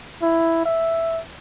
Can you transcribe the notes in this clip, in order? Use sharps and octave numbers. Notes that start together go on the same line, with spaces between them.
E4
E5